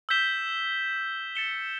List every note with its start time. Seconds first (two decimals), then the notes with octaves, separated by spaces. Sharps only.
0.09 E6 G6 B6 E7 G7
1.35 A6 C#7 E7 G7